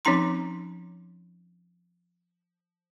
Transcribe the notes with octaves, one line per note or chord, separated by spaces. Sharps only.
F3 C4 C#4 D#4 A#5 C6